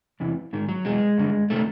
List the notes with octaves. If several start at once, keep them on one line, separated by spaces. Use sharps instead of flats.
E2 C3 E3
G#2 D#3
F#3
E2 B2 G#3
G2 D3
C3 D#3 A3